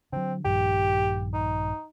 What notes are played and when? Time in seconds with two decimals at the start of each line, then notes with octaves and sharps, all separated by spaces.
0.13 D3 F#3 C4
0.45 A#1 G2 D#3 G4
1.34 D#4